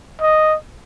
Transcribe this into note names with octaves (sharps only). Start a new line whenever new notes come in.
D#5